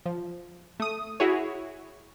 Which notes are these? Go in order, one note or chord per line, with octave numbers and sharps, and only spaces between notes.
F3
A3 D#6
E4 F#4 G#4 C#5